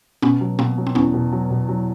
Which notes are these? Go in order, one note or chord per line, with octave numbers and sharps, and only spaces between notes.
B2 B3 C#4
F#3
B2 A#3 C4
F#3
C4
E2 B3 C#4
B2
F#3
B2
F#3